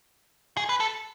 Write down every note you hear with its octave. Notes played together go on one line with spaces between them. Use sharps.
G#4
B4
A4